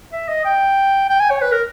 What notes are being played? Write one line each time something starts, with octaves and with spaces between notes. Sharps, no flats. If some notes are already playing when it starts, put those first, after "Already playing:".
E5
D#5
G5
G5
G#5
C#5
B4
A#4